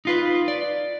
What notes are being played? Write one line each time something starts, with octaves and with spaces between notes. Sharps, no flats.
D#4 F4 B4
D5